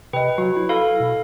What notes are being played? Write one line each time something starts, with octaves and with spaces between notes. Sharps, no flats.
C3 B4 D#5 G5
F#3 F#4
E4
A4 F5 B5
B2